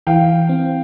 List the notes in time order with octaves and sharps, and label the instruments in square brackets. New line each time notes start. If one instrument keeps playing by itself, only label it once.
[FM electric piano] E3 [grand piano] F5 G5
[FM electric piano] C4